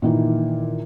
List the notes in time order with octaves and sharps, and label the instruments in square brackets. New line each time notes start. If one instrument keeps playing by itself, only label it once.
[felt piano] A#2 D#3 E3